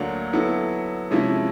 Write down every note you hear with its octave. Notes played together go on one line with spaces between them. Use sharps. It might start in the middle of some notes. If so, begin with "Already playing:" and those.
Already playing: D2 D3 F#3 A#3 D4
F#3 B3 E4 A4
C3 F3 G#3 C#4 E4